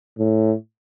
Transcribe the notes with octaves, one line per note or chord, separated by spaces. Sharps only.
A2